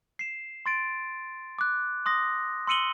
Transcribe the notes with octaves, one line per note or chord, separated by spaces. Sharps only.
C7 E7
C6 A6 D7
D6 F#6
C6 D#6 A#6
C6 E6 C#7 D#7 F#7 G7